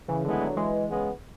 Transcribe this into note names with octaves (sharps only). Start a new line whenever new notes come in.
C#3 E3
A2 D3 G#3 B3 E4
D3 F#3
E3 G#3
C#3 G#3 B3